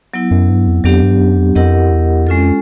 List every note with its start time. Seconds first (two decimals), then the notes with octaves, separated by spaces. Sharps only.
0.14 F#3 B3 E4
0.31 F#2
0.49 G2
0.67 F2
0.84 F2 F#3 B3 D4 G4
1.03 G2
1.20 F#2
1.38 F2
1.55 F2 E4 G4 A#4 D#5 F#5
1.91 E2
2.27 F2 G#3 C#4 F4 A4